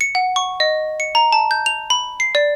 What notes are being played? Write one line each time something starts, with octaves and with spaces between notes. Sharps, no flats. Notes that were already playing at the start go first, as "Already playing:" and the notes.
C#7
F#5
C#6
D#5
C#7
A#5
A5
G6
F7
B5
C7
D5